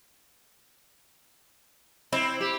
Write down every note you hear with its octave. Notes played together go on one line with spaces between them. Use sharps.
C4 E4
G4